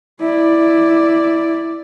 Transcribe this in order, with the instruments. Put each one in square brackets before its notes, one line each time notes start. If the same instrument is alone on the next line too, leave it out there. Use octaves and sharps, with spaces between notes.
[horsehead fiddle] E4 D5